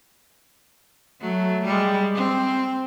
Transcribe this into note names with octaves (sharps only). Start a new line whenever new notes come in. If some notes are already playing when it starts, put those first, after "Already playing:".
F#3 A3
G3 G#3
C4